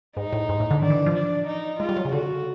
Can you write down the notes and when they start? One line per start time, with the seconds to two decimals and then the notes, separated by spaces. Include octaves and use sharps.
0.17 G#2 D#4
0.33 A2
0.49 G#2
0.60 A2
0.71 D3
0.82 D#3 D4
0.90 E3
1.06 F3
1.15 D4
1.47 D#4
1.80 G#3 F4
1.89 G3
1.97 F#3
2.05 C#3
2.12 D3 F#4